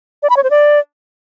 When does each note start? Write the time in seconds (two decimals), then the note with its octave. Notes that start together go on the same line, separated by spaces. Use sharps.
0.23 D5
0.30 B5
0.37 C#5
0.44 C5
0.50 D5